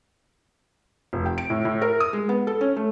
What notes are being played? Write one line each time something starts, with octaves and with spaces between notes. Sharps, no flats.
F1
G5
D7
A2
A2
A#4
D#6
G#3
B3
A4
C#4
A3